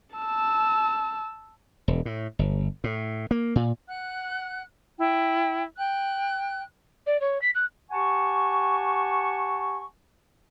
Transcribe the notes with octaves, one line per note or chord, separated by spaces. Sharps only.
A5 E6
E1
A2
G1
A2
A#3
A#2
F#5 F#6
E4 G5
G5 F#6
D5
C#5
B6
F#6
G4 F#5 G#5 A5 C#6